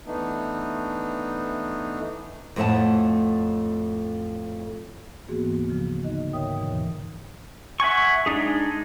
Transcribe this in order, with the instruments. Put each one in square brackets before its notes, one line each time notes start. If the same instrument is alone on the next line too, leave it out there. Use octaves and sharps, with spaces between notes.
[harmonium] E3 A3 B3 D4 D#4
[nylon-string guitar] F2 A2 A3 E5 F#5 A5
[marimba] G#2 E3 A#3 B3 F#4 G#4
D2
C#3 F3
D3 D#4 D#5
G#2 A#4 C#5 E5 G5 D#6
D#2 G#2 B2 D3 E3
[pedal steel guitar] E5 F#5 G#5 C#6
G#3 D4 D#4 G#4